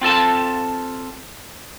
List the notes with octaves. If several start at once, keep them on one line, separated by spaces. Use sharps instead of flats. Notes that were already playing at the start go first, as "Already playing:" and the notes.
C4 F4 A4 A5